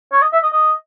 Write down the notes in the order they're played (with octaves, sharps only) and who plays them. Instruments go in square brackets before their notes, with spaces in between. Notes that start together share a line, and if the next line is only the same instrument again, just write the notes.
[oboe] C#5
D#5
E5
D#5
D#5